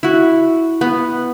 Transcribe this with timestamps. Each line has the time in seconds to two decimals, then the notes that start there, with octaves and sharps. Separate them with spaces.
0.03 E4 F#4
0.81 B3